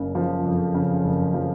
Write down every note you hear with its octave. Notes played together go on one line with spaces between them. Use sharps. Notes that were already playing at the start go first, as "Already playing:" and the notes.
Already playing: F#1 C#3
F3
F2
C#3
F#1
F3